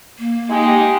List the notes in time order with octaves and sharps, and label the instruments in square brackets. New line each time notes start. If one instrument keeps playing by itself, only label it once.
[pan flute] A#3
[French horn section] G#3 D#4 G4